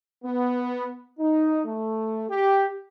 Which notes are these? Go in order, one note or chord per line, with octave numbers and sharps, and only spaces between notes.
B3
D#4
A3
G4